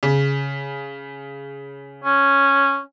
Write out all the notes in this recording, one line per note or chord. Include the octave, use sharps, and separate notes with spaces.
C#3
C#4